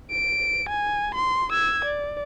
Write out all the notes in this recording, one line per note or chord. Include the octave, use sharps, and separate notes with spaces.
D7
G#5
C6
E6 G#6
D5